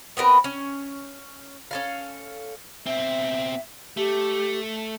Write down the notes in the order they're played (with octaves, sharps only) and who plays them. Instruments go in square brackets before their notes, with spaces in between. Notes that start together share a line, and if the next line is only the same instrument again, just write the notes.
[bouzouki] B3 C4 A#4 B4
C#4
C#4 A4 F5
[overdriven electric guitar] B2 C4 [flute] E5
[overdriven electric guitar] A3 [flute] G4